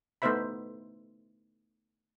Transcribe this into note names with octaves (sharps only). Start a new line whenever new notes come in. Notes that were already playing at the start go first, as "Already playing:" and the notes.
A3 B3 D#4 C5 E5 B5